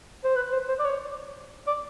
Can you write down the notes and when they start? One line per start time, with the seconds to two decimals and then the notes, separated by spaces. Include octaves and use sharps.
0.24 C5
0.36 B4
0.53 C5
0.68 C5
0.79 D5
0.85 C#5
1.67 D5